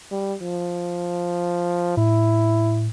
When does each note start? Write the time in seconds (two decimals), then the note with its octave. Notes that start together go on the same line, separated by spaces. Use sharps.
0.11 G3
0.42 F3
1.97 A2 E4